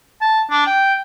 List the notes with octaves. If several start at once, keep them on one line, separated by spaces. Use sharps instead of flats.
A5
D4
G5